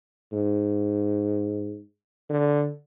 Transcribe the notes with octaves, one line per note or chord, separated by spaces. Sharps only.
G#2
D3